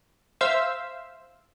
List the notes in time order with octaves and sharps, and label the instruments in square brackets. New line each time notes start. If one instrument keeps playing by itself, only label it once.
[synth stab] C5 E5 F5 E6